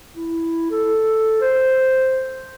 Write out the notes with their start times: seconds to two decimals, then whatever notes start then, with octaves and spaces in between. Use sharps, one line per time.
0.15 E4
0.71 A4
1.41 C5